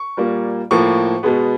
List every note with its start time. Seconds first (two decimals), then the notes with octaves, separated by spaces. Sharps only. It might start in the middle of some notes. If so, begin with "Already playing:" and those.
Already playing: C#6
0.17 A#2 G3 A#3
0.71 A2 F3 A#3 C#6
1.23 B2 G#3 B3